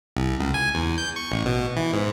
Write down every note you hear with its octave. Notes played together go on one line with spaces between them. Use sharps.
C2
C#2
G#5
E2
G6
C#6
A1
B2
E3
G#2